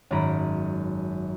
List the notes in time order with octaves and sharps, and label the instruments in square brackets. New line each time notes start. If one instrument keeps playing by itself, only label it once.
[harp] G#1 F#2 C#4 A#5 B5 D7